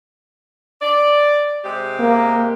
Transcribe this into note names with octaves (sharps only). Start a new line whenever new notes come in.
D5
C3 G#3 G4
A#3